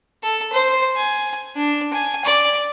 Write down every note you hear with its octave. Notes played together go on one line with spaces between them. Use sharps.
A4
C5
G#5
D4
G#5
D5